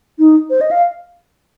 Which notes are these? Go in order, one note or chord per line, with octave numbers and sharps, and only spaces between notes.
D#4
C5
D#5
F5